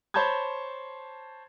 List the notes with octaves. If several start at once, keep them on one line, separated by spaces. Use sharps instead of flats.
C5 C#5 A5 B5 G6 G#6